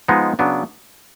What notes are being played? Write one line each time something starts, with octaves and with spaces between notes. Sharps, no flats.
F3 G#3 B3 D#4
C#3 F#3 B3 D4